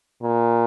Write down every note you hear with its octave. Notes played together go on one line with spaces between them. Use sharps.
A#2